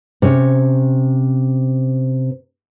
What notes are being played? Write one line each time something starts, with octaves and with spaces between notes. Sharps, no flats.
C3 C#4 C#5